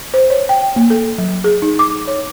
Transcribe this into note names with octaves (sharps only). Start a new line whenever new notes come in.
C5
C#5
G5
A#3
A4
F#3
G#4
D#4
D6
C#5